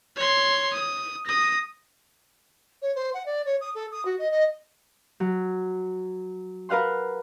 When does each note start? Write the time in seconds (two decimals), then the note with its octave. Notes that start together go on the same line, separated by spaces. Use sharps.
0.16 C#5 C6
0.73 D#6
1.26 D#6 A#6
2.82 C#5
2.95 C5
3.14 F#5
3.26 D5
3.46 C#5
3.61 D#6
3.75 A4
3.92 D#6
4.05 F#4
4.19 D#5
4.31 D#5
5.20 F#3
6.69 A#4 B4 F5 F#5 C6